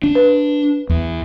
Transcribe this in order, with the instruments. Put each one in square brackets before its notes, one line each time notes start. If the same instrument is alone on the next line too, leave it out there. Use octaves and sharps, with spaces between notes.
[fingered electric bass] D4
[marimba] B4
[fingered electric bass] E2